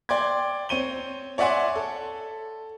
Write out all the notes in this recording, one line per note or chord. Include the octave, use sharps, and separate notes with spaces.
D5 G5 C6 D6 G#6
C4 C#5 D#7 G7
C#5 D5 E5 F#5 G#5 C6
A4